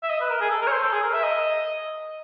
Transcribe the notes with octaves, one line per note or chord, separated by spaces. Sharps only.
E5
D#5
B4
A#4
G#4
A4
A#4
C#5
C5
A4
G#4
A#4
E5
D#5